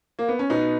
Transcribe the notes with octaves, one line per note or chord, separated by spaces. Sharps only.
A#3
B3
C#4
B2 B3 D#4